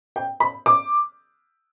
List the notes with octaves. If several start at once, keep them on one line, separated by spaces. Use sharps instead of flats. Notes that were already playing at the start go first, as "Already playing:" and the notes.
G5
B5
D6